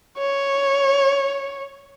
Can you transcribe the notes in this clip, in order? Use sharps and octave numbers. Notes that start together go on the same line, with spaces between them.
C#5